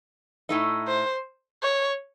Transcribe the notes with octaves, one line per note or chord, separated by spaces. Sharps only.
A2 A3 D#4
C5
C#5